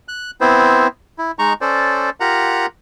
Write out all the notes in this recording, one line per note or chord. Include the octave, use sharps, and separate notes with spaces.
F#6
B3 C4 E4 C5
E4
G#3 D#4 A#5 C#6
C#4 A4 C5 D5
F4 G4 A#4 F#5 A#5